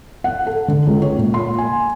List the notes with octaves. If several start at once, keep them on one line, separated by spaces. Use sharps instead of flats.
F#5
A4
D3
C#2
C#5
A#2
C6
G#5